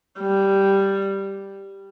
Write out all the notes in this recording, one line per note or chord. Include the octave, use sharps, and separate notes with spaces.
G3